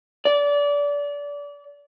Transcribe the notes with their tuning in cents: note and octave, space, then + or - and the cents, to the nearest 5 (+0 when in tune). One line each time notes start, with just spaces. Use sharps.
D5 -25